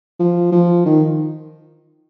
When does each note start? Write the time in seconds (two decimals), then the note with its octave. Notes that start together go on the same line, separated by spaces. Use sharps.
0.19 F3
0.52 F3
0.86 D#3